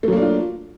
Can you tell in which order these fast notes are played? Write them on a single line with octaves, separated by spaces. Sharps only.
A3 F#3 A#3 D4 F4